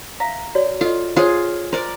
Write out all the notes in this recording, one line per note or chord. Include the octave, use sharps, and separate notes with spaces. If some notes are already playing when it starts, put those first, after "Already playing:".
E5 F5 A#5
F#4 C#5 D5
F4 A4 D#5
F4 G#4 C5 C#5
A#4 C5 D5 C6